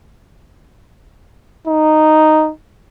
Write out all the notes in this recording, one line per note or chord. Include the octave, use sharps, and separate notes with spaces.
D#4